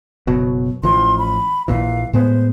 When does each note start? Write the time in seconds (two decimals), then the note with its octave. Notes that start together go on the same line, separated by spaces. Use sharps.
0.27 F#1 B2 F#3
0.83 A1 E3 F3 C6
1.18 B5
1.68 A#1 A#2 E3 F5
2.13 A2 G#3 B3 C5